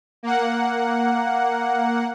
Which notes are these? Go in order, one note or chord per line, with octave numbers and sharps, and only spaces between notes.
A#3 F#5